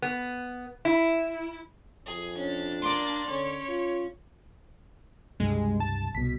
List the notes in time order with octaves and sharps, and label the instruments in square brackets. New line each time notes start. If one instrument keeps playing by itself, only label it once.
[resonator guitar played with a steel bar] B3
E4
[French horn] F2 [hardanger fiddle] G#4 G#5
[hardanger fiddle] C#4 [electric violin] D4 A6
[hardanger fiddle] A#3 D5 [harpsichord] C6 D6
[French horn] D3 [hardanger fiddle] C#4 [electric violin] C#5
[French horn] F4
[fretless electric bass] C#2 G2 C3 [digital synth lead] G#3
[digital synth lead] A5
[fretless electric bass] C2 B2 [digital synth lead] B6